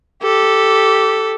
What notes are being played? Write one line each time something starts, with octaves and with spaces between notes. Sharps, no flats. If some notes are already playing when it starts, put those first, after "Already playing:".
G4 A4